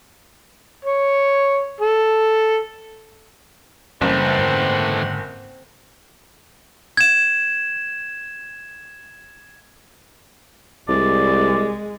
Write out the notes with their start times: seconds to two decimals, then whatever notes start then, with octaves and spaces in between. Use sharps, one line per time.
0.85 C#5
1.81 A4
4.02 F#1 C#3 E3 G3 A3 C4 F#5
4.39 G#2 D3
6.97 G#6 E7
10.88 C2 G#3 D5